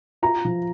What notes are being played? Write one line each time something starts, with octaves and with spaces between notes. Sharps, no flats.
F4 A#5
F3